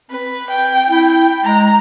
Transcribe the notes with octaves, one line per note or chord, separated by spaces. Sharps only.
C4 B4
G5
E4
G#3 A#5